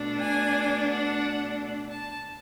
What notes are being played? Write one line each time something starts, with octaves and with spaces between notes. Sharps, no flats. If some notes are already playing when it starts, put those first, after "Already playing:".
Already playing: B2 A3 D4
G#5
F#5
A5